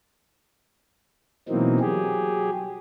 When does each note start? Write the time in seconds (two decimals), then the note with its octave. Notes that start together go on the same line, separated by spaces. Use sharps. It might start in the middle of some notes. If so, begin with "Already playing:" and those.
1.49 B2 E3 F#3 A#3 C4 D#4
1.80 F#3 G4 G#4